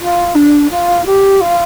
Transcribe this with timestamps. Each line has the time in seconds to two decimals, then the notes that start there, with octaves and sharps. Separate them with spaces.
0.01 F4
0.35 D4
0.70 F4
1.06 G4
1.40 F4